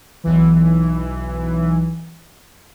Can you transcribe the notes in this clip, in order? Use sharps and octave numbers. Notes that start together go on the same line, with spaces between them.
B1 E3